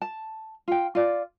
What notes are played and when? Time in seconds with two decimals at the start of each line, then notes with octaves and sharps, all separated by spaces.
0.02 A5
0.68 F4 G5
0.95 F4 D5